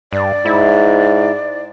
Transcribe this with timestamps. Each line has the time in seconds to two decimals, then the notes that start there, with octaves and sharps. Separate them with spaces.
0.13 G2 D5
0.45 G#2 E4